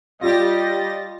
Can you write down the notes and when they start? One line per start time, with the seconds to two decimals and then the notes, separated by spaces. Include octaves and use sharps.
0.21 G3 F4 G4 D#5 A6 A#6